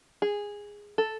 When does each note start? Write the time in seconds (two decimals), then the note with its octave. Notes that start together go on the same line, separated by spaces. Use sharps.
0.22 G#4
0.98 A4